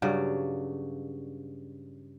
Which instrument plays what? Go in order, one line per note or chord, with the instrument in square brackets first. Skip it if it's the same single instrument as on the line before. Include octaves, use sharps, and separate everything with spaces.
[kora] G2 C#3 F#3 D5